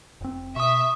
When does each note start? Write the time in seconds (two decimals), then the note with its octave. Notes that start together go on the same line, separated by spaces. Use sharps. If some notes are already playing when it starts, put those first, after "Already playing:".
0.21 F1 C4
0.56 B2 E5 C#6 D#6